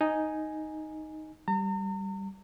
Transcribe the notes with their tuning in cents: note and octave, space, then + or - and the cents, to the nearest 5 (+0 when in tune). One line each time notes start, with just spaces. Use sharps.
D#4 +0 G#5 +0
G3 -5 A#5 -40